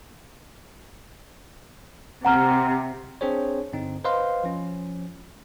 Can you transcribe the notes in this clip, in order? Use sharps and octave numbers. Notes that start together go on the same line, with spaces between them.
C3 F#5 A#5 F6
C4 D4 G#4 C5 C#5
G2 D3 C4 D#4
B4 C5 D#5 F5 C6
F3 C#4